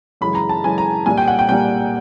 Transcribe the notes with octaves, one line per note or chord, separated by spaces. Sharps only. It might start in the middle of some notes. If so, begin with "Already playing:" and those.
F#2 C#3 E3 G#3 B5
A#5
A5
F#2 C#3 E3 G#3 G#5
A#5
C2 A#2 G3 A#3 G#5
G5
F#5
G5
C2 A#2 G3 A#3 G5